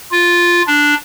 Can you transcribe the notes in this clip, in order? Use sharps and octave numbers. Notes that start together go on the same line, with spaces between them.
F4
D4